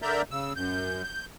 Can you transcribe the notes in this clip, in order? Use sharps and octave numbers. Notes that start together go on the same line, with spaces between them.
D3 A#4 D5 E5 A#5 G6
C#3 E6
F#2 G6
G6